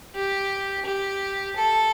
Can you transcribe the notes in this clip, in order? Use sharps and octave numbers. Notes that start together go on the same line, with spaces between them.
G4
G4
A4